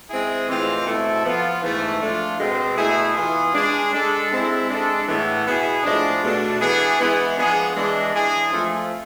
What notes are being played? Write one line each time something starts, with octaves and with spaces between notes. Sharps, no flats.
G#3 C4 E4 G#4
A2 E3 G#3 C4 F4
B2 A3 C4 E4 A4
F3 B3 F4
G#2 E3 A3
F3 A3 D4 F4
B2 G#3 C4
B2 A3 E4 G#4
E3 B3 F4 G#4
G#3 D4 G#4
G#3 D4 A4
G#3 C4 E4
G#3 D4 A4
A2 E3 B3
B2 B3 E4 G#4
A2 F3 G#3 D4
B2 A3 D4
E3 B3 D4 G#4
E3 G#3 B3 E4 G#4
F3 G#3 B3 D4 G#4
E3 G#3 D4
E3 G#3 D4 G#4
F3 A3 C4 F4